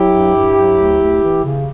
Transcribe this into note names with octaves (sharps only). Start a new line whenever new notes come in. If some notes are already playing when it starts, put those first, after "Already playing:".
Already playing: F#3 E4 G4
G2
G2
F#3
D2
D2
E3
C#3